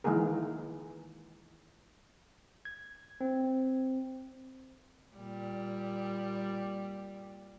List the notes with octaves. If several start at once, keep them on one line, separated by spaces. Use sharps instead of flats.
D#3 E3 G#3 A#3 G#4 A#4
G#6
C4
A#2 G3